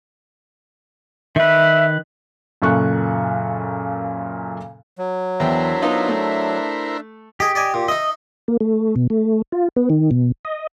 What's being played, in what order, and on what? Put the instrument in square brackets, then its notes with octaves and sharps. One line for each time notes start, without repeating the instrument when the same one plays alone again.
[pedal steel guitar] D#3 B4 [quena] E5
[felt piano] F#2 A#2 C#3 A4 C#6 F#6
[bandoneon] F#3
[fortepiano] E2 G5 [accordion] D4 E5 [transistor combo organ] E4 A#4 C5
[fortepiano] B3 D#4 F4
A3
[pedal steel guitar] G4 [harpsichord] G#4 D#5
[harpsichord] D5 D#5 G#5
A#2
[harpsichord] D#4 E5 [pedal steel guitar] D#5
[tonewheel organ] A#3
A3
B2
A3
F4
B3
D#3
B2
D#5